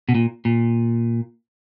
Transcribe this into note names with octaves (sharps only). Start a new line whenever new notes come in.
B2
A#2
A#2